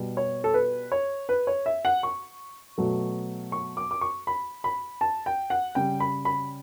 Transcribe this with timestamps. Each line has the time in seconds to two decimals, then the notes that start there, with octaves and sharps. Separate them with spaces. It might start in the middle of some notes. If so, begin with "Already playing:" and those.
Already playing: B2 G3
0.17 C#5
0.44 A4
0.54 B4
0.92 C#5
1.29 B4
1.47 C#5
1.66 E5
1.85 F#5
2.03 C#6
2.78 B2 F#3 A3
3.52 C#6
3.77 D6
3.91 D6
4.01 C#6
4.27 B5
4.64 B5
5.01 A5
5.26 G5
5.50 F#5
5.75 C#3 G3 G5
6.00 B5
6.25 B5